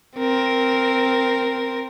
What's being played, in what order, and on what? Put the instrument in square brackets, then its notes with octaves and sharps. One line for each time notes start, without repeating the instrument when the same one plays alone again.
[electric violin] C4 A#4